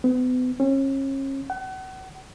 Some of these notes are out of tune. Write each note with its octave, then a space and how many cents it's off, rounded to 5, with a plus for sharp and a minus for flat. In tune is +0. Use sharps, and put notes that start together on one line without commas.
B3 +40
C#4 -35
F#5 +35